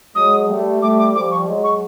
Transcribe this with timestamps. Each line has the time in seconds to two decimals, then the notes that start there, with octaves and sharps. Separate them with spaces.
0.15 F#3 G#3 D#6
0.48 G3 A3
0.81 G3 A3 D6
0.98 D6
1.14 F3 G3 D6
1.31 C#6
1.47 F#3 G#3
1.64 C#6